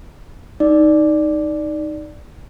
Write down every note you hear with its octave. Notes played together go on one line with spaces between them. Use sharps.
D#4 D5